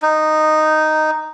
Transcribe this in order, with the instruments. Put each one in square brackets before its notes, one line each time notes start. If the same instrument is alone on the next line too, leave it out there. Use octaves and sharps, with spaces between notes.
[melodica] D#4